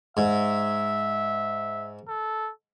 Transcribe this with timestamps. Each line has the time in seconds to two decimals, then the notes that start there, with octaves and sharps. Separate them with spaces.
0.17 G#2 E5
2.08 A4